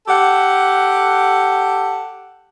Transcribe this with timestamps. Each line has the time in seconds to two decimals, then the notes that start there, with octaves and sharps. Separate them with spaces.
0.08 G4 A4 F#5